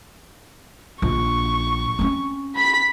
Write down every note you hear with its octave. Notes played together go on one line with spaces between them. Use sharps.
A#1 C#6
C4 C#4
B5 B6